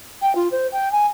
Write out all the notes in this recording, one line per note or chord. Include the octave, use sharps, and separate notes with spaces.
G5
F4
C5
G5
G#5